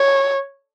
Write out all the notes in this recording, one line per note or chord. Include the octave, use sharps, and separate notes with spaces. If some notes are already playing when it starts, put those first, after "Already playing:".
Already playing: C#5